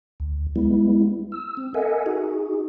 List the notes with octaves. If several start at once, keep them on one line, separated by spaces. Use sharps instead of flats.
D2
G3 G#3 B3 E4
E6
C4
A4 A#4 D#5 E5 F#5 G#5
D#4 F#4 G#4